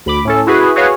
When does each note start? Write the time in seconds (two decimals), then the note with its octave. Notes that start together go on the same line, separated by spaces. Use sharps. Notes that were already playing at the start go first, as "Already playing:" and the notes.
0.06 D2 B5 D6
0.25 A2 C#4 A4
0.47 E4 F#4 G#4 B4
0.76 F#4 G#4 B4 C#5 F5 G#5